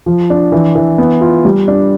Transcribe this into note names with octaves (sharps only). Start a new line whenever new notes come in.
F3
D4
E3
E3
B3
F4
G3
D4